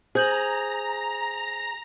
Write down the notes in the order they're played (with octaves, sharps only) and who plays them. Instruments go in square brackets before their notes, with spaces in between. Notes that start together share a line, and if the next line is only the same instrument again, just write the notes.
[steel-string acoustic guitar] G#4 [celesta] C5 G6 F#7 [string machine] A#5